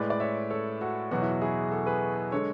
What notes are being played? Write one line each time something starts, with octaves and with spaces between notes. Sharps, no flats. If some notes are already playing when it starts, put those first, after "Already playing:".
Already playing: A2 G#3 B4 D5
D5
C#5 E5
A4 C#5
F#4 A4
E2 B2 F#3 F#4
E4
F#4
E4 G#4
F#4 A4
G#4 B4
D3 G#3 A4 C#5